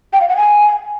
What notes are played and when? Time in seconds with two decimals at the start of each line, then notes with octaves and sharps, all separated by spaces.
0.13 G5
0.21 F5
0.29 F#5
0.37 G#5